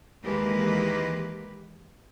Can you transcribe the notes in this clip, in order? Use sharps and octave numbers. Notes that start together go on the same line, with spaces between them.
D#2 E3 G#3 A#3 G4 B4